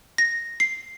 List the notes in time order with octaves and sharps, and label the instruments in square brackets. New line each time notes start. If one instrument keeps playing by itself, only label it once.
[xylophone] A#6
C7